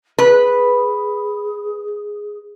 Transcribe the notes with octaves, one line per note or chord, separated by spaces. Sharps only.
G#4 B4